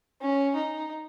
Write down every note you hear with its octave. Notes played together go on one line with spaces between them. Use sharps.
C#4
D#4